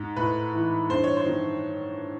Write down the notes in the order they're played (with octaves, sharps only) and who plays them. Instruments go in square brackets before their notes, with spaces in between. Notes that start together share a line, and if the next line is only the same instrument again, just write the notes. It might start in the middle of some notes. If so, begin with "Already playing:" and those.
Already playing: [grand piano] G#2
A2 B4
E3
G2 C5
C#5
C5
D#3